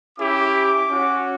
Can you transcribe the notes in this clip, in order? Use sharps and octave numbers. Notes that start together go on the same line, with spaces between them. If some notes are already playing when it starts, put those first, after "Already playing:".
C#4 E4 G4 D6
C#4 F#4